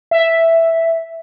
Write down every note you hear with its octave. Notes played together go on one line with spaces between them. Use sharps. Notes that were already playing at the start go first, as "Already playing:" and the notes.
E5